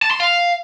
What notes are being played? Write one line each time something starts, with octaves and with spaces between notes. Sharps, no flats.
A5
C6
F5